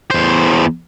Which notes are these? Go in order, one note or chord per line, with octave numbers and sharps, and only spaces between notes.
E2 C5